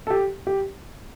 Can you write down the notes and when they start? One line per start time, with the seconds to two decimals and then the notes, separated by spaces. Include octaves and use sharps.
0.07 A4
0.10 G4
0.47 G4